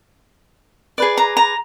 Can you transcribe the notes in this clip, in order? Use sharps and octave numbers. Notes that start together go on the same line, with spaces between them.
G#4 B4 D5
A#5
A#5